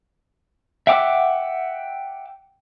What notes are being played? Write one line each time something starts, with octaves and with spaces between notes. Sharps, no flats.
E5 F#5 G5 D6 E6